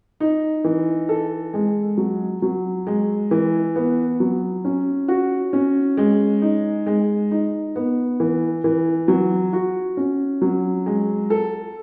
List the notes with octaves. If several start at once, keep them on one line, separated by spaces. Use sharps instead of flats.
D#4
E3
A4
G#3
F#3
F#3
G#3
E3
B3
F#3
C#4
F#4
C#4
G#3
D#4
G#3
D#4
B3
E3
E3
F#3
F#4
C#4
F#3
G#3
A4